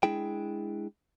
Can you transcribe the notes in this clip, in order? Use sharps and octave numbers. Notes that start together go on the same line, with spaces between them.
G#3 D4 E4 G#4 G5